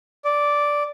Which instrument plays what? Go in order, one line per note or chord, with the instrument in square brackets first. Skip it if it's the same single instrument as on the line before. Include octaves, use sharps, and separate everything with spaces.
[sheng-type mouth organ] D5